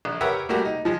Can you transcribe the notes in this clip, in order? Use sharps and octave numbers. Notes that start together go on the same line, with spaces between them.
A#1
G4 A#4 B4 C#5 E5 F#5
G3 A3 A#3 F#4 G4
D#4
F3 G#3